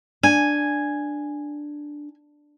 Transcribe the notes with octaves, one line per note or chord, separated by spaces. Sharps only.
D4 G#5